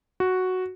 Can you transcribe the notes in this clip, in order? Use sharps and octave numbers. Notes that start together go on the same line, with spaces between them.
F#4